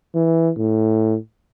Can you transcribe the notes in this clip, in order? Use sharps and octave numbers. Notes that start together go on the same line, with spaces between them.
E3
A2